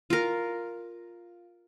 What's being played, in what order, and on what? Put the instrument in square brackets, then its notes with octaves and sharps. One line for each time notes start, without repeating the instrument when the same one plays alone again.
[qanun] F4 A#4